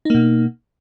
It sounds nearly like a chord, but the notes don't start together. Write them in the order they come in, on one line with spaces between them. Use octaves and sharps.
D#4 A#3 B2